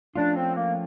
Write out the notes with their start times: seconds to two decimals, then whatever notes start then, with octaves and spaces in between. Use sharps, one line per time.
0.16 F3 A3 C#4 D4 F4
0.35 C4
0.56 A#3